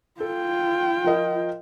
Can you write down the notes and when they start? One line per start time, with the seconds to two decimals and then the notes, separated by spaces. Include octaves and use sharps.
0.20 F4 A4 G5
1.04 F3 A#4 D#5